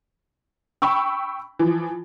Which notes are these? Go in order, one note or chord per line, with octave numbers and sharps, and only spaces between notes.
G5 B5 C#6 E6
E3 F3